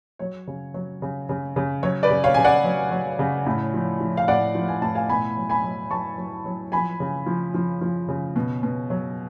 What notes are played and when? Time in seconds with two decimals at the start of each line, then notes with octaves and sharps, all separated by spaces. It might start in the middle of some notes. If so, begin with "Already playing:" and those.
0.19 F#3 C#5
0.47 C#3
0.74 F#3
1.02 C#3
1.29 C#3
1.56 C#3
1.83 F#3 C#5
2.03 B4 D5
2.10 C#3
2.24 C#5 F5
2.34 C#3 G#5
2.45 D5 F#5
2.64 F#3
2.91 F#3
3.19 C#3
3.46 A2
3.74 F3
4.00 F3
4.17 F5
4.28 A2 D5 F#5
4.55 F3
4.68 G#5
4.82 A2 A5
4.95 F5 G#5
5.09 B2 G#5 B5
5.37 F#3
5.50 G#5 B5
5.64 F#3
5.91 F#3 A5 C#6
6.18 F#3
6.45 F#3
6.72 F3 G#5 B5
7.00 C#3
7.26 F3
7.54 F3
7.81 F3
8.08 C#3
8.36 B2
8.63 B2
8.90 F#3